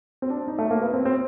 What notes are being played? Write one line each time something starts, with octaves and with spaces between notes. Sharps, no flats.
C4
D4
D#4
A3
A#3
B3
C4
C4